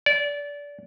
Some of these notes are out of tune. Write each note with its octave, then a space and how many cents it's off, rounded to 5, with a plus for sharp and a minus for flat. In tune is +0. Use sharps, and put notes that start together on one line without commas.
D5 -25